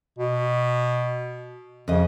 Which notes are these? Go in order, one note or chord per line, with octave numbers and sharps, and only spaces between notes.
B2
F2 C#3 D#5